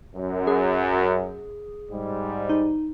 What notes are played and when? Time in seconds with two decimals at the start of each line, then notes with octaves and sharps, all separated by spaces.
0.16 F#2
0.47 G#4
1.90 G#2 G3
2.49 D#4